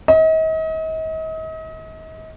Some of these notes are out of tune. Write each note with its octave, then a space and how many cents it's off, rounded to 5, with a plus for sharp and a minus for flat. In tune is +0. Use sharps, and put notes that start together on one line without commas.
D#5 +40